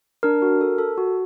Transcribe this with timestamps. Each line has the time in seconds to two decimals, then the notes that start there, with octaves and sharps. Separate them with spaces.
0.23 D4 A#4
0.42 F#4
0.61 A4
0.78 A4
0.98 F#4